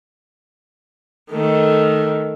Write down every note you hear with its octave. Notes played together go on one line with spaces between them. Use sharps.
D#3 A3